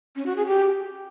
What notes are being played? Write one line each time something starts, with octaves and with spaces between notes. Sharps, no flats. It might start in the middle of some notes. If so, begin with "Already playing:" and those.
C#4
F#4
G#4
G4